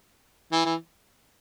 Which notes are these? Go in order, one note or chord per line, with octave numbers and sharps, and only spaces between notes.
E3
E3